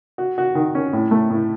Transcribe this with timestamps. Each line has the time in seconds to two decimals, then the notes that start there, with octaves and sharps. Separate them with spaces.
0.18 F#4
0.38 F#4
0.55 D#3
0.75 C#4
0.93 A2
1.11 A3
1.30 A2